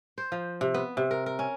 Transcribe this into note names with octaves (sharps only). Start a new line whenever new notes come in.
C5
F3
C3
B3
C3
A#4
A#4
C#4